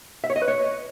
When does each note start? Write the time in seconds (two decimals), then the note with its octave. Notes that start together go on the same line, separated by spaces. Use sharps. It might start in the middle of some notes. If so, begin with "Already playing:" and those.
0.24 E5
0.30 C#5
0.36 D#5
0.42 B4
0.48 C#5